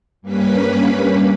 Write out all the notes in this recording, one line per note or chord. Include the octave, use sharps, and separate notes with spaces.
G2 G3 A#3 C#4 B4 B5